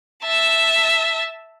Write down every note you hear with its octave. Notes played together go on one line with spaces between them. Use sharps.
E5 A5